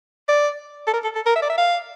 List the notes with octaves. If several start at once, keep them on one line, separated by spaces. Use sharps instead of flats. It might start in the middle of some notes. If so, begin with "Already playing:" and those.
D5
A4
A#4
A4
A4
A#4
E5
D5
E5
F5